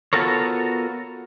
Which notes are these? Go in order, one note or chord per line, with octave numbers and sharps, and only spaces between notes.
B3 F4 F#4 A4 A#4 C#5